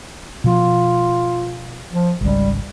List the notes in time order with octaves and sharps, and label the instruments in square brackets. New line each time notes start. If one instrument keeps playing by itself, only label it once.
[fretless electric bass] B2 F3 [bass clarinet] F4
[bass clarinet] F3
[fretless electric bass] G#1 C#2 [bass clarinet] G3